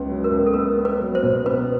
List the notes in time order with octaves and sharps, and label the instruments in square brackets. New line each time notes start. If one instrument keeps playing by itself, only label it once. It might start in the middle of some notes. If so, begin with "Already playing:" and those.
Already playing: [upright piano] C#2 B3
F#3
[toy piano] A#4
[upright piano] C#2
[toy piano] A4
[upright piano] B3 [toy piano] A#4
[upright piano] B3
[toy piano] B4
[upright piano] F#3
[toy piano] C5
[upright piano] B2
[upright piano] B3 [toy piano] B4